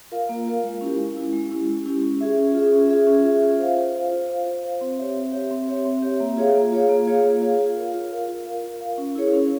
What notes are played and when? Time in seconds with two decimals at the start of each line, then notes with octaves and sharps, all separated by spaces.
0.12 F4 A#4 F5
0.29 A#3
0.46 F4 A#4 F5
0.64 G#3
0.81 C#4 E4 G4
0.99 G#3
1.16 C#4 E4 G4
1.33 G#3
1.50 C#4 E4 G4
1.68 G#3
1.85 C#4 E4 G4
2.03 C#4
2.21 F4 G#4 E5
2.37 C#4
2.54 F4 G#4 E5
2.72 C#4
2.89 F4 G#4 E5
3.07 C#4
3.25 F4 G#4 E5
3.42 F4
3.59 C5 F5
3.77 F4
3.94 C5 F5
4.12 F4
4.29 C5 F5
4.46 F4
4.63 C5 F5
4.81 C4
4.98 G4 C#5 E5
5.16 C4
5.33 G4 C#5 E5
5.51 C4
5.68 G4 C#5 E5
5.85 C4
6.02 G4 C#5 E5
6.20 A#3
6.37 F4 G#4 C#5 F5
6.55 A#3
6.72 F4 G#4 C#5 F5
6.89 A#3
7.07 F4 G#4 C#5 F5
7.24 A#3
7.41 F4 G#4 C#5 F5
7.59 F4
7.76 A#4 F5
7.94 F4
8.11 A#4 F5
8.28 F4
8.46 A#4 F5
8.63 F4
8.81 A#4 F5
8.98 C#4
9.15 E4 G#4 C#5
9.33 C#4